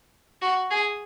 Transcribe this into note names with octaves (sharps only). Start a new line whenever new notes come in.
F#4
G#4